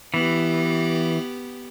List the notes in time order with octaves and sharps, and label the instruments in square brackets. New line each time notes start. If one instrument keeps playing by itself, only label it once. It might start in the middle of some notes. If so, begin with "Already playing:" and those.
[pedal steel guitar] E3 [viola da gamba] B3 G4